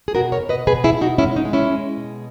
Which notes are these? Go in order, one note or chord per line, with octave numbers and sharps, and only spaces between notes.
G#4
B2 F#4 A#4
A#4 C#5
B2
B4 D#5
B2 G#4 B4
E4 G#4
B2
D#4 F#4
G#3 C#4 E4
D#4
G#3
C#4 E4
G#3
B2